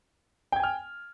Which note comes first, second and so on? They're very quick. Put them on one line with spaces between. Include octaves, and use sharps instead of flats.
G5 G#6 G#5 F6